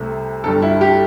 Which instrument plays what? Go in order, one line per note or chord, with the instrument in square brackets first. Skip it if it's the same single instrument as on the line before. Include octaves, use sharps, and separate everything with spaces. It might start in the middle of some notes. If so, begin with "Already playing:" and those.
Already playing: [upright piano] C2 C3 A3
G1 G2 G3 A4
E4
G4